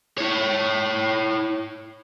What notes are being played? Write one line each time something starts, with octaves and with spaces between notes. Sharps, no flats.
E4 C#5